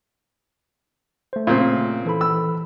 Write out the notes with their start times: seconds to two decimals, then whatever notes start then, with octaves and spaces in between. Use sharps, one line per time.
1.33 A3 C5
1.47 A#2 C#3 C4
2.05 E3 A4 B5
2.21 E6